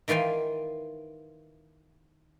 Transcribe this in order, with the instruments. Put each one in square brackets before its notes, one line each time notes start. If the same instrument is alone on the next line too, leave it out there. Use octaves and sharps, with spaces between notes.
[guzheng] D#3 E3 F4 G5 G#5